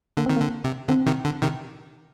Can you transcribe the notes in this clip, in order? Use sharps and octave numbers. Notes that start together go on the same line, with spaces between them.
D3 A#3
D#3 C4
D3 A#3
C3
D3 C4
C3 D#3
D3
C3 D#3